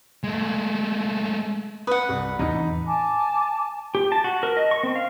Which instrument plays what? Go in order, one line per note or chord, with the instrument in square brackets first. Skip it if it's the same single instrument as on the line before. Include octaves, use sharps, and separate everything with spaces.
[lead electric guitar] G#3 A3
[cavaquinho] B4 F#5 [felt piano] D#6
[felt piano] C2
[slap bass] E2 A2 E3 [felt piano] D#4
[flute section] G#5 A5 D6
[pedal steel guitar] G4
A5
F#4
A#4
D#5
C#6
C4
F5